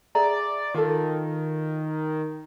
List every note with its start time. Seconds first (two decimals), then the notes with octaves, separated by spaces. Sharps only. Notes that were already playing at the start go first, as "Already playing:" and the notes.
0.15 G#4 D5 E5 A#5
0.75 D#3 F4 A4